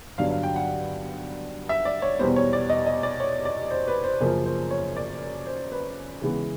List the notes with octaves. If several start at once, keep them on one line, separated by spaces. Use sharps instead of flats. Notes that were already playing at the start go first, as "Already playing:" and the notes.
G2 D3 F#3 B3 F5
F5
G5
F#5
E5
D5
C#5
E2 B2 G3 B3 C5
C#5
D5
D#5
D#5
D5
C#5
D5
C5
B4
C5
F#2 C#3 F3 A#3 C5
C5
C#5
D5
C5
B4
C#3 E3 G#3 B3